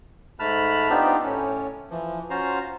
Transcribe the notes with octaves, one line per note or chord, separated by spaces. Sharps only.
G#2 A3 A5 B5 F6 F#6
B3 C4 D4 D#4 F4 G4
A2 C#4
E3 F3
C#4 F4 F#4 C5 F5 A#5